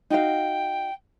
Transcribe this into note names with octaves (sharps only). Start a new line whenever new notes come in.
D#4 F#4 F5 G5